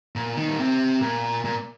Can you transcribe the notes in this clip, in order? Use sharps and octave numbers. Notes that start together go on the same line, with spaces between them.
A#2
D#3
A#2
C3
A#2
A#2